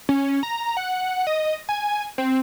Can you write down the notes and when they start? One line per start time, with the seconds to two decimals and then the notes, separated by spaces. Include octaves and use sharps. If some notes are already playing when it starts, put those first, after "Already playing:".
0.09 C#4
0.43 A#5
0.77 F#5
1.27 D#5
1.69 G#5
2.18 C4